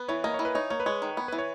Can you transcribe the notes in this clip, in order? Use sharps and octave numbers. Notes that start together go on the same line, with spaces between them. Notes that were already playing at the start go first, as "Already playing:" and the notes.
Already playing: B3 B4
E3 C#5
A#3 D#5
E3 C#5
B4
D#4 C#5
A#3 C#5
B4
G#3 C#5
D#3
B3
E3 B4
C#5